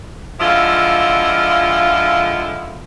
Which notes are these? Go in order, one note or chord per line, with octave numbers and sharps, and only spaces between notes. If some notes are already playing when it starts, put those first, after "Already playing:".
D3 F3 G#3 E4 F4